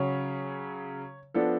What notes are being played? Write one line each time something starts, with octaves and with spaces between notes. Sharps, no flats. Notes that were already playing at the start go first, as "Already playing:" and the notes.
Already playing: C#3 F#3 C#4 C#5
F3 B3 D4 A4